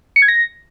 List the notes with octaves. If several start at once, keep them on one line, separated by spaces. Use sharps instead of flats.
C#7
G#6
A#6